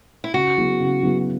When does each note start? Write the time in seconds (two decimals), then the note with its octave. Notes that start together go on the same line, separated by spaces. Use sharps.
0.24 E4
0.34 C#3 F#4
0.57 F#3 B3 E4 G#4
0.80 C#3
1.03 F#3 B3 E4 G#4